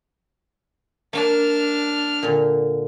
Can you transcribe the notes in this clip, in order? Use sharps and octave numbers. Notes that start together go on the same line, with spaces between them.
A#3 D4 F6
A#2 D3